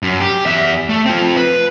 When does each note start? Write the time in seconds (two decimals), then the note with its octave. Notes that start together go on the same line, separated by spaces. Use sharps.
0.03 F#2
0.20 G4
0.46 E2 E5
0.89 A3
1.06 C4 F4
1.36 B4